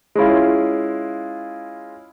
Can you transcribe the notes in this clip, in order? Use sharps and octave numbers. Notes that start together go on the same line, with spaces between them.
G#3 C#4 E4 F4